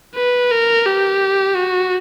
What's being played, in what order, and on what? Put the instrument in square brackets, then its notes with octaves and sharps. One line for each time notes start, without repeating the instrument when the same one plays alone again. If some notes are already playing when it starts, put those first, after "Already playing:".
[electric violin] B4
A#4
G4
F#4